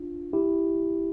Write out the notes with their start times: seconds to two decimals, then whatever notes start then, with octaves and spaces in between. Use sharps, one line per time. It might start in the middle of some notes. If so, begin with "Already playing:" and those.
Already playing: D4 F4
0.33 E4 G4